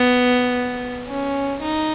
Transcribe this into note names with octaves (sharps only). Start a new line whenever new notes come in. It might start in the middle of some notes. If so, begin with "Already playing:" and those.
Already playing: B3
C#4
D#4